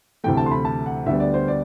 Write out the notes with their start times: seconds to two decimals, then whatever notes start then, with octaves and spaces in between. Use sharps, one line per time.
0.24 D2 C3 E3 A3 G5
0.37 A5
0.46 C6
0.51 B5
0.65 A5
0.86 F#5
1.06 D2 D3 G3 B3 E5
1.20 D5
1.34 C5
1.48 D5